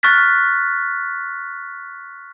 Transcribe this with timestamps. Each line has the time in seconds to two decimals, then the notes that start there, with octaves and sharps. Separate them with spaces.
0.03 C#6 F6 F#6 A6 B6